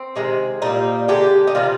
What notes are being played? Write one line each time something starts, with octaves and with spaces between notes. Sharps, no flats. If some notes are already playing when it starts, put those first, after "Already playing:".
Already playing: C4
C3 D#3 G#3
A#2 G3 A#3 D#4
D3 G#3 G4
D#4
C3 D#3 G3 F4